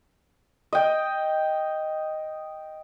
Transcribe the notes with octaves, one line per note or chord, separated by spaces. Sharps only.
D#5 G5